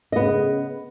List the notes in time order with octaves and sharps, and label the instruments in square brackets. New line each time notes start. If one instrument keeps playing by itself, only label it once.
[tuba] C#3 [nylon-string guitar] B3 D#5